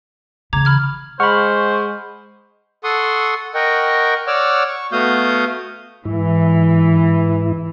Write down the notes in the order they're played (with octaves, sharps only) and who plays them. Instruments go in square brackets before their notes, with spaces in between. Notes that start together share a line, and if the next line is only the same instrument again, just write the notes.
[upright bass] C#3 E3 [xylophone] A#5 D6 G#6
[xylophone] B5 F6 G#6
[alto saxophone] G#3 [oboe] C5 [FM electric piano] F#5 C#6 [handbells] B5 F6
[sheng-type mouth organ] A4 F#5 C6 C#6 D#6
A#4 D#5 F#5 G5 C#6
C#5 D5 F#5 D6 E6 F6
C#6
A3 B3 F#4 F5 D#6 G6
[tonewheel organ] G#2 E4 [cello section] E3